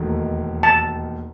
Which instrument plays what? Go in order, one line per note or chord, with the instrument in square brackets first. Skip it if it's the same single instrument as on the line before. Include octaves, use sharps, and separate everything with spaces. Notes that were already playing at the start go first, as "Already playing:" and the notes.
Already playing: [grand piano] E1 D#2 D#3 A3
[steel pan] A5